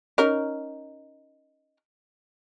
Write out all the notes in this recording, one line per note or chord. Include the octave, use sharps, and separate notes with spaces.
C#4 D#4 A#4